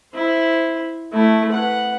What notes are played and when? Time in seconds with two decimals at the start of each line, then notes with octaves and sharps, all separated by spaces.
0.14 E4 C5
1.12 A3 E4
1.52 B4 F#5